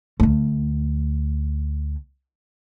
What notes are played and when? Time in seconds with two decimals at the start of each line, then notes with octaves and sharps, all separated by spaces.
0.20 D2 A3